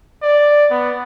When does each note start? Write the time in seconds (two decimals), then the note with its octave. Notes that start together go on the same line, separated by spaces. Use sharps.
0.23 D5
0.71 B3